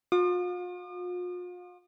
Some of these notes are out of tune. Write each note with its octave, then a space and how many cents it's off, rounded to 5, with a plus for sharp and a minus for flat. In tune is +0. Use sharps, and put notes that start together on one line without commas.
F4 +40 D#6 -45